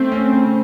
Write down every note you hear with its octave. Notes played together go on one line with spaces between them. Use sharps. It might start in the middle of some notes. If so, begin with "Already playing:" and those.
Already playing: A3 C4
C#4
C#3